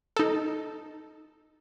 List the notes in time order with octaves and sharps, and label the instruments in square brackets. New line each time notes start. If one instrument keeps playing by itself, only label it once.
[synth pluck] D#4 A4